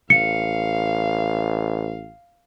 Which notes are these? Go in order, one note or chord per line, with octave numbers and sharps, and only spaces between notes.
A1 F5 C#7